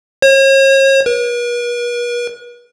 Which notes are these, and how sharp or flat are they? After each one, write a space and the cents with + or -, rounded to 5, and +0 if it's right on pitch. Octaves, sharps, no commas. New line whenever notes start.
C#5 -40
B4 -45